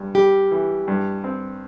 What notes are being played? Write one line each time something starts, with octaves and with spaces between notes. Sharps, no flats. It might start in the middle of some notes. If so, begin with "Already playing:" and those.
Already playing: G2
G3 G4
E3
G2
C4